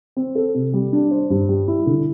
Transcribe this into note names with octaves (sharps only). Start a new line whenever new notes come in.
C4
A4
C3
G3
D4
C5
G2
G3
E4
D3